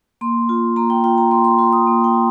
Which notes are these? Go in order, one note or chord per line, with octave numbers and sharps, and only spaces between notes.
A#3 C6
F4
A#3 A#5
G5
F4 G5
A#5
A#3 C6
C6
F4 C6
D#6
A#3
G5
F4